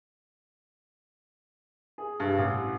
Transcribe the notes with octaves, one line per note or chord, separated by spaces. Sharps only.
G#4
G2
A1